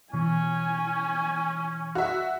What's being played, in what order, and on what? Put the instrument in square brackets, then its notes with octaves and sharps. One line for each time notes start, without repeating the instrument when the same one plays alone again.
[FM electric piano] B2 E3 [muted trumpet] C#4 [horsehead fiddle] G#5
[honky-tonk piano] F#4 E5